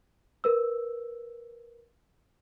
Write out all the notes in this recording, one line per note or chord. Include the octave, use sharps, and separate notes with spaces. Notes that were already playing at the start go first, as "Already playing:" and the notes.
A#4 B4 E6